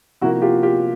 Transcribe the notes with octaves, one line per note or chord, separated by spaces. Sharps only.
C3 F3 A#3 E4 F#4
F4 G4
F4 G4